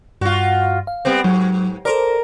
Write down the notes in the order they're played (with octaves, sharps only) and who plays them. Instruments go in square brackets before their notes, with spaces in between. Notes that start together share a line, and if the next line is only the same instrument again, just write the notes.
[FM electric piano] G2 [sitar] F4 F#4
[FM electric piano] F5
[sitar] G3 B3 C4
[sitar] G#2 [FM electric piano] F#3
[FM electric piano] A4 C5 D5 [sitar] A#4